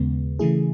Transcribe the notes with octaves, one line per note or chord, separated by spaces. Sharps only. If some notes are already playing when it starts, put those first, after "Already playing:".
Already playing: D#2 C#3 G#3 B3
C#3 E3 A3 E4 G#4